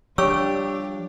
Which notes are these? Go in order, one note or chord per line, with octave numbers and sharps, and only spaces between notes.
F3 G3 D4 G4 C#5 C#6 E6